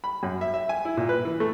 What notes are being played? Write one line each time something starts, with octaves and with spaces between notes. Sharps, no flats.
B5
F#2
E5
E5
G#5
E4
A#2
B4
E3
A3